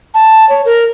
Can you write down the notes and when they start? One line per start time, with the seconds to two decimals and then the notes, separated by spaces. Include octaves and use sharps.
0.14 A5
0.49 C#5
0.65 A#4